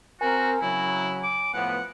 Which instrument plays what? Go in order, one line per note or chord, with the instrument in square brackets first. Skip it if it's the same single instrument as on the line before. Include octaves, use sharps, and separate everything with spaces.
[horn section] C4 A#4 [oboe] F#4 [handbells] G#5
[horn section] C#3 F#3 [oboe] E4
[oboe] D6
[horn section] A2 F3 B3 [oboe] F#5